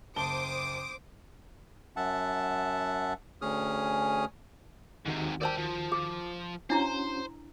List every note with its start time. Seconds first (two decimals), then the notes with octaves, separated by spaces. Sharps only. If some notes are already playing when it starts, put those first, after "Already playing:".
0.16 F#1 C5 A5 D6 D#6 G7
1.96 F#2 E5 F#5 A5
3.42 D2 C#4 G#4 D#6 F6
5.06 D#2 G#2 C3 D#3 F#4
5.42 A#4 C5 D5 G5 A5
5.58 F3
5.92 G#4
6.70 C#4 D4 E4 F#4 C5 A#5